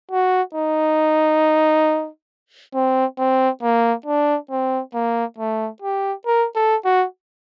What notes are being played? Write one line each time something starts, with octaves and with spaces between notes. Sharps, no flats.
F#4
D#4
C4
C4
A#3
D4
C4
A#3
A3
G4
A#4
A4
F#4